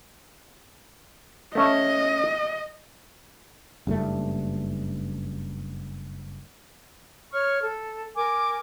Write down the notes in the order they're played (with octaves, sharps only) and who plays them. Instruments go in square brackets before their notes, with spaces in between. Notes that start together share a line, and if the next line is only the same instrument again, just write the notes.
[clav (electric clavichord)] A3 C#4 E5 [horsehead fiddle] D#5
[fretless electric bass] F#1 G2 A#2 A3
[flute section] C#5 C#6 F6
A4
A#4 G#5 D6